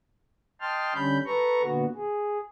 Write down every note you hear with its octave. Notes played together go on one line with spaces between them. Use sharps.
D#5 G5 A5 C6 F6
D3 G3 C#4 B5 G6
A4 B4 A#5 C#6
A#2 D3 B3 F#4
G#4